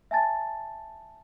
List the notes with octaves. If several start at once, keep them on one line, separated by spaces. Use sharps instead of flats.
E5 G#5 A5 A6